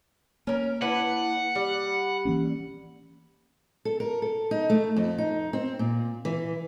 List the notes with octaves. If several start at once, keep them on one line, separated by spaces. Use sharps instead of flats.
A#3 C#4 A#4
D4 E4 B4 F#5
G3
E3 A#3 C#4
A4
A#4
A4
D#4
A3
F2
D#4
C4
A#2
E3